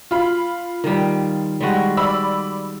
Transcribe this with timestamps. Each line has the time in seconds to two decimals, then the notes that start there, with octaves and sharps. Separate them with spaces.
0.11 F4 B5
0.84 D#3 G3
1.61 G3 G#3 F#4
1.97 D5 B5 E6